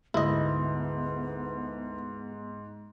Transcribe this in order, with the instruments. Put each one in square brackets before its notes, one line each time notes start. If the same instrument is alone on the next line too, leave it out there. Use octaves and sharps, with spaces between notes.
[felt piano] D2 [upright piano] G#2 [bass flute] B3 [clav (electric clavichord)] E4 D#5